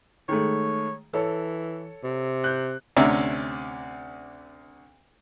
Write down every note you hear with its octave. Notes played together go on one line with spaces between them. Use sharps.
D#3 G#3 A3 C#5
E3 A4 C#5
C3
F#6 G6
D2 C3 C#4 D4 E5 A#5